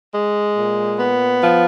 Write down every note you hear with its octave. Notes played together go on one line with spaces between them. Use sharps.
G#3
A#2
B3
F3